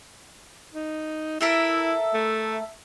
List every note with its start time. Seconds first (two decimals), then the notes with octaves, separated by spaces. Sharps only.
0.74 D#4
1.41 E4 A4 A#4 E5
2.14 A3